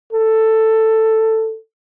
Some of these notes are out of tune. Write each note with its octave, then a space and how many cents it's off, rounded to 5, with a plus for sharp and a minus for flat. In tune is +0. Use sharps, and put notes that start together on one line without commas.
A4 +10